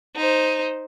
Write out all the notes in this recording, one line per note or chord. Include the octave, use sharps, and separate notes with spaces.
D#4 C5